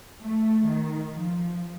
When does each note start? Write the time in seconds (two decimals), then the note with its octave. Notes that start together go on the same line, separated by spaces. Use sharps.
0.21 A3
0.67 D#3
1.11 F3